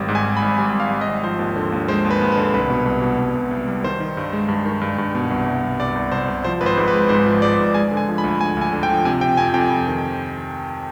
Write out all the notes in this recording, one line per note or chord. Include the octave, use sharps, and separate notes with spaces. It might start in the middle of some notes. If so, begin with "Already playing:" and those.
Already playing: G#1 G3
G#2
G#5
G#1
B5
G#1
G3 G#5
G3
F5
G3
D#5
G#1
F3 C5
D#2
D3
D#2
G#3 C5
D#2
B4
D#2
B4
D3
C2 B4
B2
C2
B2
C2
C2
C2
G3
D#3 C5
D#3
G2
G#3
G2
D#3
G2
G2
B2
C2
C2
C2
C2 D5
C2
C2 C5
C2
F3 C5
G#1 B4
C5
G#2
B4
G#3
G#2 C5
F3
G#3 D5
G#2
G#3 G#5
D3
G#5
F3
B5
D2
D2 G#5
D2 G#5
D3
G5
F3
C3 G#5
C3 G5
F2 G#5
F2 G5
F2
D#3